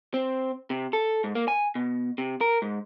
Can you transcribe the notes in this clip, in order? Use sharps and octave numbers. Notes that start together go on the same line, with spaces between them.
C4
C3
A4
G#2
A#3
G#5
B2
C3
A#4
G#2